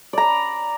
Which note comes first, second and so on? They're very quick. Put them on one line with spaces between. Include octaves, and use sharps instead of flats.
D5 A#5 B5